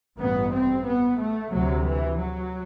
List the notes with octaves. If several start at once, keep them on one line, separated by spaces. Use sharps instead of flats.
A1 G2 B3
C4
B3
A3
D2 C3 F#3
E3
F#3